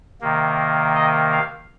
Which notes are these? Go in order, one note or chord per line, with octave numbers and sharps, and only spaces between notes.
C3 D#3 A#3
D#5
F5